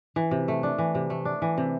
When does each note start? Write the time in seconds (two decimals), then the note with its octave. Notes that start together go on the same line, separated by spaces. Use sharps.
0.16 E3
0.31 C3
0.48 A3
0.63 D4
0.78 E3
0.95 C3
1.10 A3
1.25 D4
1.42 E3
1.58 C3